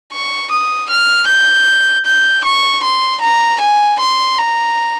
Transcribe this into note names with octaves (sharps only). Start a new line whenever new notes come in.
C#6
D#6
F6
G6
G6
C#6
C6
A#5
G#5
C6
A#5